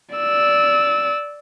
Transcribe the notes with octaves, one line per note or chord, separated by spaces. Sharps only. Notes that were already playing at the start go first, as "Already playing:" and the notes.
D5 E6